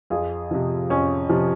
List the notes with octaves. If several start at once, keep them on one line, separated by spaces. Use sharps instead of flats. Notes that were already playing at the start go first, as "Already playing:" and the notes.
F2 F4 G#4
C3 F3
F2 C#4
C3 F3